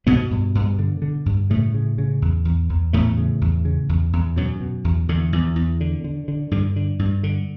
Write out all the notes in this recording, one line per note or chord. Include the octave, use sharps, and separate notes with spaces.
G2 B2 B3
G2
G2
D3
D3
G2
A2 C#3 A3
C#3
C#3
E2
E2
E2
E2 A2 A3
C#3
E2
C#3
E2
E2
F#2 B2 F#3
B2
E2
E2 D3
E2
E2
D3
D3
D3
G2 D3
D3
G2
D3